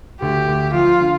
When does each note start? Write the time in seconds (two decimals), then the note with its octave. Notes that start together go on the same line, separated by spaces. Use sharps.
0.21 D2 G4
0.48 D2
0.74 F3 F4
1.00 D3